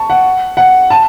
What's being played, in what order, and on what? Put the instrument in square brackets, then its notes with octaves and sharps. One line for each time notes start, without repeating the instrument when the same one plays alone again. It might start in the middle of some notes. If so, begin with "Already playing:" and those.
Already playing: [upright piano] A5 C#6
F#5
F#5
A5